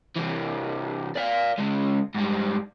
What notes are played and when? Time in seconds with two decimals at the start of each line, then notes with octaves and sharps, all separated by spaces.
0.16 C3 E3
1.16 D5 F5
1.58 C#3 G#3
2.14 G#2 G3